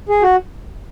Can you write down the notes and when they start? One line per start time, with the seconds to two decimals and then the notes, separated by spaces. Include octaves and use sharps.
0.09 G#4
0.22 F#4